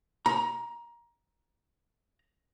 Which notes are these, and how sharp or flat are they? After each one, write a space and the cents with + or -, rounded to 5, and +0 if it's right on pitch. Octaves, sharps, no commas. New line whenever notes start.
A#5 +20